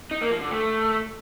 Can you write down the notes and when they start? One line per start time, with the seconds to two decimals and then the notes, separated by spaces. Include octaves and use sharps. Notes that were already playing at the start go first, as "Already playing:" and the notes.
0.11 D#4
0.21 A#3
0.31 F3
0.41 D3
0.51 A3